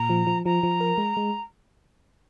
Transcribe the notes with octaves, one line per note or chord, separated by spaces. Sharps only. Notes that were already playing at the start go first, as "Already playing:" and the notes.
Already playing: A#2 A#5
F3
F3
F3 A#5
F3
A#4
G#3
G#3